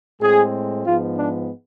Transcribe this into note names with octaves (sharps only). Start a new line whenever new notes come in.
A2 G#3 C4 G#4
G#2 F3 G#3 B3 F4
D4